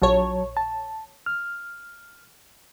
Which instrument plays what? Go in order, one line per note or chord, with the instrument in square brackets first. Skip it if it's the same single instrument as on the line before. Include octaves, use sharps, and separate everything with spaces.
[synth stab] A#1 C#5 [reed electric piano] F#3 A5
[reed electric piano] A5
F6